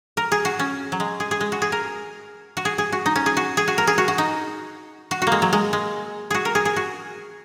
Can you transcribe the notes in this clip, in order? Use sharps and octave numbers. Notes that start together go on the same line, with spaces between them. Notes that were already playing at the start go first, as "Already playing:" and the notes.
A#4
G#4
F#4
C#4
F#3
G#3
G#4
G#4
G#3
F#4
G#4
A#4
F#4
G#4
G#4
F#4
D#4
C#4
G#4
F#4
G#4
F#4
A#4
G#4
F#4
F#4
D#4
F#4
F#4
G#3 A#3
F#3
G#3
G#3
F#4 G#4
A#4
G#4
G#4
F#4